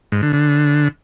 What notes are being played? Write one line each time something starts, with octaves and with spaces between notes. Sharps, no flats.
G#2
D3
D3